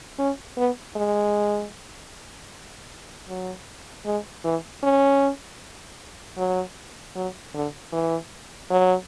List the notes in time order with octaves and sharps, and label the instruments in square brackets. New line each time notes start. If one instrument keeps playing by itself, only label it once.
[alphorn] C#4
B3
G#3
F#3
G#3
E3
C#4
F#3
F#3
D3
E3
F#3